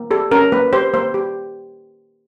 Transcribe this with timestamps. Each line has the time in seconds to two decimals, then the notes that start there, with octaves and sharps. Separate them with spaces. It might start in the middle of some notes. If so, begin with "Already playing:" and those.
Already playing: A#3
0.11 G4 A4
0.31 C#4 A#4
0.52 A#3 B4
0.73 G4 C5
0.94 A#3 C5
1.14 G4